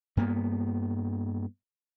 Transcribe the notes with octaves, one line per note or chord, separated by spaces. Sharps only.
G2 A#3 B3